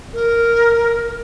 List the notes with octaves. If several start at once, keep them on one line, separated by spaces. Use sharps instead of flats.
A#4